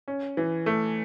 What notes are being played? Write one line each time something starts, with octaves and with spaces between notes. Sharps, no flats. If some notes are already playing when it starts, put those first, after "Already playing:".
C#4
E3
A3